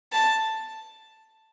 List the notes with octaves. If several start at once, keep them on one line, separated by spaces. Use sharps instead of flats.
A5